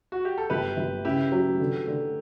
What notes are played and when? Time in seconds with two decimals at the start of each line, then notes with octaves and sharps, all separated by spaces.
0.12 F#4
0.25 G4
0.38 A4
0.50 G1 G4 B4
0.77 G1
1.05 C#3 E4 G4
1.32 F#3
1.60 D3
1.87 D3